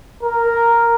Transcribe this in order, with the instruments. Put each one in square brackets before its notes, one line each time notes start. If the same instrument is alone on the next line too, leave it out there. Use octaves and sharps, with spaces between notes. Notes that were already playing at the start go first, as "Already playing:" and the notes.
[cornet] A#4